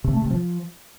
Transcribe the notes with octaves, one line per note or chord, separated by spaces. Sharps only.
C3
A3
C3
F3